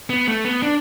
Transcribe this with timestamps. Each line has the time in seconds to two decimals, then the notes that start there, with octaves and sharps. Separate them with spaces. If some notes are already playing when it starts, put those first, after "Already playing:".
0.10 B3
0.28 A3
0.45 B3
0.62 D4